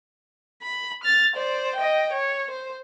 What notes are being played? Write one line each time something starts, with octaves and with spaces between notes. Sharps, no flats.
B5
F6 A6
C5 D5
D#5 G5
C#5
C5